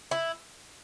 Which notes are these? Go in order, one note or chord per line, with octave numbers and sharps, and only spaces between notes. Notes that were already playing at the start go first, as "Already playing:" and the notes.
E4